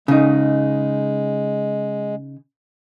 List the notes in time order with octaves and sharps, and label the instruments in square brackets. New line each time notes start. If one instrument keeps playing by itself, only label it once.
[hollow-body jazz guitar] C#3 D#4 [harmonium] G#3